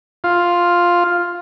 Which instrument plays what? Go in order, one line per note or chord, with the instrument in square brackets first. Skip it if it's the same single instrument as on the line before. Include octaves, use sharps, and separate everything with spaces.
[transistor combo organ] F4